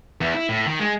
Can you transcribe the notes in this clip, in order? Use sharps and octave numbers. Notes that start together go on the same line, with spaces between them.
E2
E4
A2
D#3
G#3